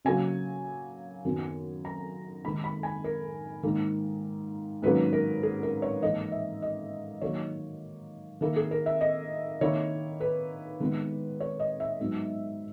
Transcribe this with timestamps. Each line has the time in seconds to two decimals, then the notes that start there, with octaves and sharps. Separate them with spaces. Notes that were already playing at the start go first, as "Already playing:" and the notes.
0.05 C#3 F#3 A#3 G#5
1.25 F#2 D#3 F#3 B3
1.85 A#5
2.44 D#3 G#3 D#4 B5
2.64 B5
2.83 G#5
3.04 A#4
3.63 G#2 D#3 A#3
4.82 G#2 D#3 F#3 A#3 C#4 B4
5.13 A#4
5.43 G#4
5.63 A#4
5.82 C#5
6.02 G#2 E3 A#3 D#5
6.32 E5
6.62 D#5
7.21 D#3 F#3 A#3 D#4 C#5
8.41 D#3 A#3 E4 A#4
8.56 G#4
8.71 A#4
8.86 E5
9.01 D#5
9.61 D#3 A#3 E4 C#5
10.20 B4
10.80 D#3 G#3 B3 E4
11.40 C#5
11.60 D#5
11.80 E5
12.00 G#2 F#3 B3 D#4